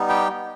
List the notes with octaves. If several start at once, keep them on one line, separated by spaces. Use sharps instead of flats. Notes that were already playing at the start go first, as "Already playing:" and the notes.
Already playing: G3 B3 D#4
G4 G5